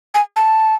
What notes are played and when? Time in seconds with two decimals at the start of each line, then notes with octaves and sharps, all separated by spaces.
0.14 G#5
0.36 A5